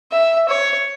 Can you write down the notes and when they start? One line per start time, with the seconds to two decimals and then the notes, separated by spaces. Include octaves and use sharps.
0.12 E5
0.49 C#5